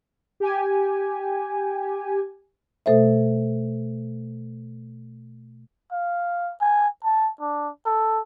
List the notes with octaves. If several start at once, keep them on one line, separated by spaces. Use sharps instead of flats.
G4 G#5
B2 A3 A4 C5 E5
F5
G#5
A5
D4
A4